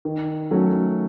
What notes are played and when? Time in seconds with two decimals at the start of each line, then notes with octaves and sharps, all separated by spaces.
0.05 D#3
0.51 F#3 A3 C#4 F#4